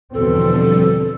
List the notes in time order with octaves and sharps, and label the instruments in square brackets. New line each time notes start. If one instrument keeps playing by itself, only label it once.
[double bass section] E2 B2 C4 [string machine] D3 F3 G3 [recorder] A4